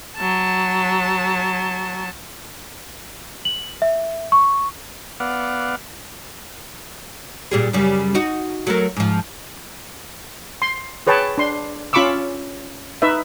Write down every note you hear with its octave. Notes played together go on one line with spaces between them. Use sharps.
F#3 A5
F#7
E5
C#6
B3 D5 F5 F#5
A#2 G3 G#4
F#2 C#3 G3
D#4 F#4
F#3 A3 A#4
G#2 F3
C6
G#4 B4 C#5 G5 A5
D4 C6
C#4 F4 B5 C#6 D6 E6
D#4 B4 E5